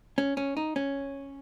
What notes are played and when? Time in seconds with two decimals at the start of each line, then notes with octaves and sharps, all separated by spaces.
0.18 C#4
0.37 C#4
0.57 D#4
0.76 C#4